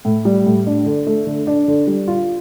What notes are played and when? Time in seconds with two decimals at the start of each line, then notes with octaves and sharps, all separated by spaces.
0.05 A2
0.25 G3
0.46 A2
0.66 D4
0.86 D3
1.07 A3
1.27 D3
1.47 D4
1.68 D3
1.87 G3
2.08 F4